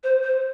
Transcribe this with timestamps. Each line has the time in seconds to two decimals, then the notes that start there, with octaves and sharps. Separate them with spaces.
0.03 C5
0.23 C5